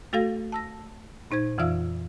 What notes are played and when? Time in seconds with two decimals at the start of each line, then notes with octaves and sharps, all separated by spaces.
0.13 A3 F#4 A4 F5 A#6
0.52 A5 E6 A#6
1.31 A#2 D#4 C5 G#6
1.58 F2 E3 F4 E5 F5 E6